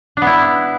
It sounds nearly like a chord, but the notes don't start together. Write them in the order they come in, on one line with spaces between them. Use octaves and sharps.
D4 B3 E4